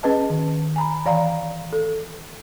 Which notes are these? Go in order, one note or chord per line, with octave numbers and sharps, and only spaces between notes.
C#4 G#4 B4 D#5 A5
D#3
G#5 A#5 B5
E3 D5 F5 G5 A#5
A4